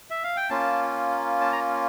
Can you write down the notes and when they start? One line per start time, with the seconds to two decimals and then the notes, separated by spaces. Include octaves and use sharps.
0.10 E5
0.24 F5
0.37 G5
0.50 A#3 C#4 F4 A5
1.41 A5
1.52 A#5